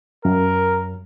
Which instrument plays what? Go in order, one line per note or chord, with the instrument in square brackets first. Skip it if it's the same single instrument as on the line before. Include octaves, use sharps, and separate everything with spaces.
[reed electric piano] F#2 [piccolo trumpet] A#4